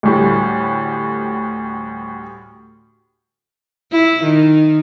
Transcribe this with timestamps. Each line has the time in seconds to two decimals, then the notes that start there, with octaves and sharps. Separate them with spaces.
0.03 D2 A2 G3
3.92 E4
4.23 D#3